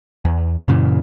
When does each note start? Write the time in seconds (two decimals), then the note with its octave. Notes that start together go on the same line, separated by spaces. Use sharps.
0.25 E2
0.68 F#2 A#2 C#3 E3